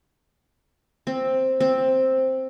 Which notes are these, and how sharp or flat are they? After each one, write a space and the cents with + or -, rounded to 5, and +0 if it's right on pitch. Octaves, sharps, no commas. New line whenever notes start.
C4 +5
C4 +5